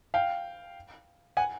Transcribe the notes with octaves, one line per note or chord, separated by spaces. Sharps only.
F5 G5
F#5 G#5